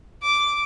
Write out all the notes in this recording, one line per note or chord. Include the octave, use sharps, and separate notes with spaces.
D6